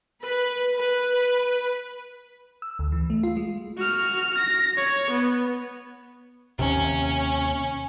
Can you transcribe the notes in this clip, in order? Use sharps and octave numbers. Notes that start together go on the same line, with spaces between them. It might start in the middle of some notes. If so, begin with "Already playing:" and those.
B4
B4
E6
D2
E3
A3
F4
G#3
F#4 F6
A#6
C#5
B3
D#2 C3 C#4